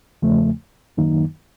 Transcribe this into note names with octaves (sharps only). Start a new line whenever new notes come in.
E2 C#3 F3 A3
F#2 D#3 F#3 A#3 D#4